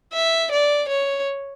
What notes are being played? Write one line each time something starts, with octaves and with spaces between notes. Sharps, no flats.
E5
D5
C#5